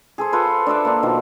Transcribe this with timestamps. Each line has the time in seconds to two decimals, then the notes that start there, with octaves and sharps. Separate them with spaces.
0.18 G#4 A4 C5
0.33 F4 A4 B4 C5
0.66 D4 A4 E5 D6
0.85 A#3 D4
1.03 B2 D#3 F3